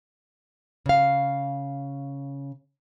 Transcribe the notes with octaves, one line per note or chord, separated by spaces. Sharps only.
C#3 F5